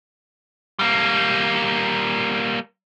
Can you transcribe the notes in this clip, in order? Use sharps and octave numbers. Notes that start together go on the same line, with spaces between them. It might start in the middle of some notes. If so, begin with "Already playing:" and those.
G3 A#3